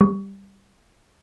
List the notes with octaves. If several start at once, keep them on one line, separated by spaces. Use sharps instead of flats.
G3